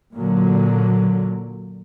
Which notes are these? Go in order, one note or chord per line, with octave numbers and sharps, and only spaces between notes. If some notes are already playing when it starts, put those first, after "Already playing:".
A#2 D3 F#3